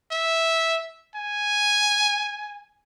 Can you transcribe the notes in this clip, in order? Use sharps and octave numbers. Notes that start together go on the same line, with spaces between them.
E5
G#5